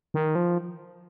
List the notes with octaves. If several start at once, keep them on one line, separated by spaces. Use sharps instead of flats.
D#3
F3